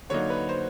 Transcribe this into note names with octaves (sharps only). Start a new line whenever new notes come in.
D3 F#3 A#3 D#4 C#5
B4
C5